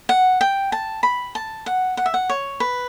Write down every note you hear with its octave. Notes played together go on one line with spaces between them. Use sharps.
F#5
G5
A5
B5
A5
F#5
F#5
E5
F#5
C#5
B4